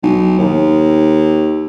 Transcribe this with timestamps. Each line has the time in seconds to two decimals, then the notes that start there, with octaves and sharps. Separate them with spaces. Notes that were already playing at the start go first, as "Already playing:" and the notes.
0.03 B1
0.38 D#2